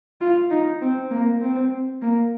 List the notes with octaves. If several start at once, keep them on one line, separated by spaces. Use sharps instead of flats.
F4
D#4
C4
A#3
C4
A#3